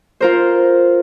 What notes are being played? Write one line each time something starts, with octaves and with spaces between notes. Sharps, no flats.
F4 A#4 C5